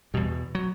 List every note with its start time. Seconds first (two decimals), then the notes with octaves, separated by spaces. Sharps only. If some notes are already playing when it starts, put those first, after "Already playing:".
0.14 E2 B2 G3
0.55 F#3